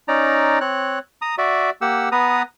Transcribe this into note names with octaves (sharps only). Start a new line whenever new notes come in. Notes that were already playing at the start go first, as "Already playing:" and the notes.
C#4 D#4 D5 A#5
C4 C#5 F#6
A#5 D#6
F#4 D5 E5
A#3 G4 F#5 E6
B3 B4 A#5 D#6